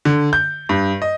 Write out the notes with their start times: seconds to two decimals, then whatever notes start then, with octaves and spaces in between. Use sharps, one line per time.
0.05 D3
0.33 G6
0.69 G2
1.02 D#5